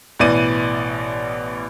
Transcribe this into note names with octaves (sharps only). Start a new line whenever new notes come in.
A1 B2 E3 D5 D#7